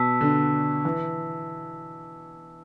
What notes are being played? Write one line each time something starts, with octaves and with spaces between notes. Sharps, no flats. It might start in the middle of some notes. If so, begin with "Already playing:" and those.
Already playing: B2 A5 E6 B6
D3
E3